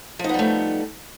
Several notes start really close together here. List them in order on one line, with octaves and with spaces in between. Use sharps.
F3 D#4 B3 G3 A3